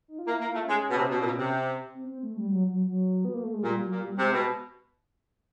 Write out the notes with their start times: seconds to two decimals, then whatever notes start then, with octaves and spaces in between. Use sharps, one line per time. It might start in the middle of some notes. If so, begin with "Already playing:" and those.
0.08 D#4
0.19 F4
0.27 A#3 E4
0.40 A#3
0.46 F4
0.54 A3
0.64 G#3 C#4
0.90 B2
0.97 C3
1.11 B2
1.20 A#2
1.25 B2
1.38 C3
1.95 C4
2.09 C4
2.23 A3
2.37 G3
2.50 F#3
2.69 F#3
2.88 F#3
3.25 B3
3.34 A#3
3.44 A3
3.54 G#3
3.63 A#2 G3
3.82 F#3
3.91 A#2
4.00 G3
4.19 C3 G#3
4.32 B2